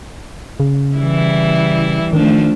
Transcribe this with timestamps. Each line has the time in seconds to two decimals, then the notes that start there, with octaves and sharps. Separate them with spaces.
0.60 C#3
0.97 E3 G3 E4
2.13 D#3 F3 A3 D4